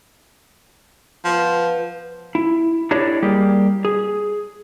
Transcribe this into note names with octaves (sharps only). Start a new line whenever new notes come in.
F3 B3
E4
D4 E4 G4 A4 C#5 D#5
G3 A#3 G4 G#4
G#4